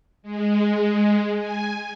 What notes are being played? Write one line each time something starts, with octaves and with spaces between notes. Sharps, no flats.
G#3
G#5